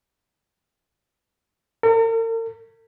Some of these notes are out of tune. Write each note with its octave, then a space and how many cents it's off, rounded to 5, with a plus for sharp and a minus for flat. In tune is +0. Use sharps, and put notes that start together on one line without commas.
A#4 -45